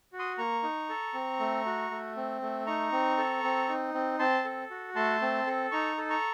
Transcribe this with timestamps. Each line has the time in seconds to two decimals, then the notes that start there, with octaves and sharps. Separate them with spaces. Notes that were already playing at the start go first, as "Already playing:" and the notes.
0.12 F#4
0.19 C6 D#6
0.38 A#3 A#5 C#6
0.63 D#4
0.89 A4
1.14 C4
1.40 A3
1.66 F#4
1.91 A3
2.17 C4
2.42 A3
2.66 D#4 A#5 C#6
2.92 C4
3.18 A4
3.43 C4
3.69 D#4
3.94 C4
4.19 C4 A5 C6
4.45 A4
4.71 F#4
4.95 A3 A5 C6
5.22 C4
5.47 A4
5.71 D#4 A#5 C#6
5.98 A4
6.10 A#5 C#6